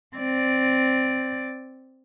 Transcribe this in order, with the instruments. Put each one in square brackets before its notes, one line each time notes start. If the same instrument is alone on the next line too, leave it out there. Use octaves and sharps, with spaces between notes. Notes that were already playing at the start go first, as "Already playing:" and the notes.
[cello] C4 D5